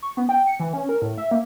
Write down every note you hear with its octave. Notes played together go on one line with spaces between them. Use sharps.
C#6
B3
G5
C#7
E3
C#4
A#4
A2
E5
A#3